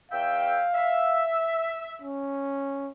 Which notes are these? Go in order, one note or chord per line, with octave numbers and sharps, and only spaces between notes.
E2 E5 F5 G5
E5
C#4